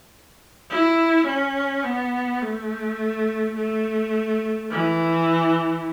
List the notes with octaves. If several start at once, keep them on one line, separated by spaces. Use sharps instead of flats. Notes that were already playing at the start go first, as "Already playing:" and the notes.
E4
C#4
B3
A3
A3
E3